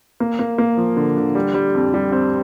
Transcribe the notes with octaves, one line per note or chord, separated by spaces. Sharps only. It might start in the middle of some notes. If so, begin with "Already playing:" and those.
A#3
A#3
A#3
F3
D3
D3
G3
G3
F2
G3
C4